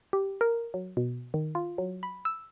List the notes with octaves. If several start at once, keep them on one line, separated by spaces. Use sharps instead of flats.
G4
A#4
F#3
B2
D#3
F4
F#3
B5
E6